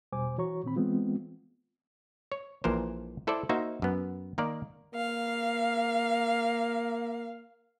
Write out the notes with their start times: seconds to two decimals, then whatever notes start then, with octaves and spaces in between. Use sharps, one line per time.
0.13 E2 B2 G3 C5 G#5 D6
0.38 E3 F#4 C#5 A#5 C#6
0.64 A#2 D#3 C4 B5
0.76 E3 G#3 B3 C4 F4
2.32 C#5
2.64 A#1 A#2 E3 A#4 C5
3.27 E4 A4 C5 D5 E5
3.49 A#3 D#4 F#4 C5 E5
3.82 F#2 B3
4.38 D#3 A#3 A#4 D5
4.95 A#3 F5